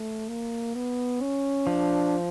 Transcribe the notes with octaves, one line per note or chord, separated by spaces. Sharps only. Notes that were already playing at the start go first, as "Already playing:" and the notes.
Already playing: A3
A#3
B3
C#4
F3 D4